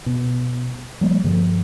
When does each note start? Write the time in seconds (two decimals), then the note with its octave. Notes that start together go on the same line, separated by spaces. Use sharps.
0.06 B2
1.01 F3 G3 A#3
1.24 G2 D3 F3